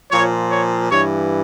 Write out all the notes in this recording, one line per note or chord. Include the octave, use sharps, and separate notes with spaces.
A#2 F3 C#5
C#5
G2 E3 C#5